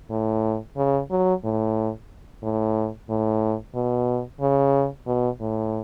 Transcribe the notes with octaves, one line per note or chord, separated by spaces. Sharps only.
A2
C#3
F#3
A2
A2
A2
B2
C#3
B2
A2